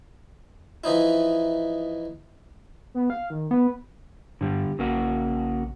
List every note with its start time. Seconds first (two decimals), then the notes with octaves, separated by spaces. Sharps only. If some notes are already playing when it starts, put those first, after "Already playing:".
0.84 E3 F3 D#4 E4
2.94 B3
3.10 F5
3.30 D#3
3.51 B3 B4
4.41 G2 D3 G3
4.79 A#1 C#3 A#3 F#4